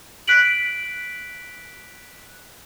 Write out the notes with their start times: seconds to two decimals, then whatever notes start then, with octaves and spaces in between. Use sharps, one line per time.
0.28 F#6 B6 D7 F#7